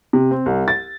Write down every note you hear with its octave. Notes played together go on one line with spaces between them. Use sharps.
C3
C4
C2
A6